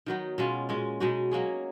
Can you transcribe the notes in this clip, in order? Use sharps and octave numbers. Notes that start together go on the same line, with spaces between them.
D#3 F#3 B3 D#4
B2 G#3 C#4 F4
A#2 G#3 C#4
B2 G#3 D#4 F#4
F#3 A#3 C#4 G#4